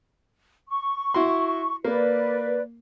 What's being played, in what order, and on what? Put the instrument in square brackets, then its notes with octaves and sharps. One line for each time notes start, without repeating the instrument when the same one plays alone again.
[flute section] C#6
[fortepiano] E4 F#4 C6
[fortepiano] A#3 [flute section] B4 D5